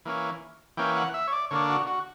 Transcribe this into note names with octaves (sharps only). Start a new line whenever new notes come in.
E3 A#3 C#4
E3 A#3 C#4 G5
F#5
E5
C#5
D5
D3 A#3 D4 C#5
F#4
F#4